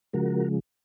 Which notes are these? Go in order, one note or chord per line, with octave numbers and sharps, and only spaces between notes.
C#3 F3 G#3 F#4 A#4